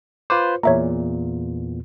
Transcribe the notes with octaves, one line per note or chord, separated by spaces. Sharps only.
F4 B4 C5 D6
E2 A#2 C#5 E5 A#5